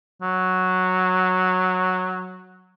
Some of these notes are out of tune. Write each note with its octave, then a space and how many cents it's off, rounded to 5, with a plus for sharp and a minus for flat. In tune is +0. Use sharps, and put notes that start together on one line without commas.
F#3 -5